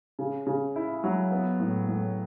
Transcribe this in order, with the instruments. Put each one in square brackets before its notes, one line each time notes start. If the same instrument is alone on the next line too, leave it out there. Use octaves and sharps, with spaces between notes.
[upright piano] C#3
C#3
E4
F#3
B3
A2
A2